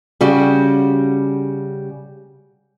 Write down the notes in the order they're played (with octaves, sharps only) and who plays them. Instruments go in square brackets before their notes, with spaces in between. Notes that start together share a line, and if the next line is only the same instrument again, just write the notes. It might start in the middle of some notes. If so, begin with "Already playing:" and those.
[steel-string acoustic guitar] C#3 G3 F#4